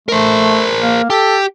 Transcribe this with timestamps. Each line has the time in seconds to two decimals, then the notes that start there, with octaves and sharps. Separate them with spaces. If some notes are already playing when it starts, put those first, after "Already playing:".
0.09 A3 A#4 C5
0.81 A#3
1.10 G4 A4